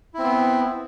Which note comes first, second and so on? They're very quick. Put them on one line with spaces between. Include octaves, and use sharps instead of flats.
E4 C4 B3